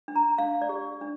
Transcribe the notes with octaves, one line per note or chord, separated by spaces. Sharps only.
D4
A#5
D4 F5
D5
G4
D4